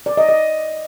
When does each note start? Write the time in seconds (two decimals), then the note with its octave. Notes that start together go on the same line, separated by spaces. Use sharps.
0.06 D5
0.17 D#5
0.29 D#5